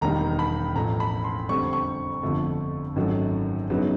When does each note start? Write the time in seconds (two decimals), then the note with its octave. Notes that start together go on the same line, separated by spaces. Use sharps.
0.01 E1 D#2 D#3 G3 A#5
0.39 B5
0.75 A1 A2 F3 A#5
1.00 B5
1.24 C6
1.49 F2 D3 G3 C4 C#6
1.73 C#6
2.23 G1 F2 D3 F3 A3
2.96 G#1 F#2 D#3 F#3 A3
3.70 F#2 C#3 F#3 B3 D#4